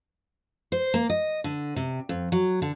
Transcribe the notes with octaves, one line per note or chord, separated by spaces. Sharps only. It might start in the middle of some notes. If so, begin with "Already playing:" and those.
C5
A#3
D#5
D3
C3
F2
F#3
D3